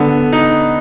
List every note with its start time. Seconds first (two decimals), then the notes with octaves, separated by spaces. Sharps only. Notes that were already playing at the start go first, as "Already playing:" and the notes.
Already playing: D3 B3
0.33 D#4